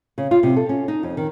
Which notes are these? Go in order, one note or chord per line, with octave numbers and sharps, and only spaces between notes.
C#3
F4
C3
A4
C#4
D#4
F2
D#3